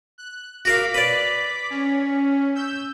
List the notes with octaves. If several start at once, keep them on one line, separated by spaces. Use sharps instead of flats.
F#6
F#4 A#4 F5 D6 B6
B4 D5
C#4
E6 G6